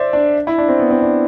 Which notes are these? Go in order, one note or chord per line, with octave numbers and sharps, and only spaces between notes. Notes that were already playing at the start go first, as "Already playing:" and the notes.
Already playing: C5 D5 E5
D4
E4
D4
C4
B3
C4
D4